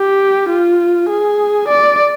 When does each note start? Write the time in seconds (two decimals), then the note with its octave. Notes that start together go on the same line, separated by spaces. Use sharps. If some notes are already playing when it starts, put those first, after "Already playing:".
Already playing: G4
0.49 F4
1.09 G#4
1.68 D5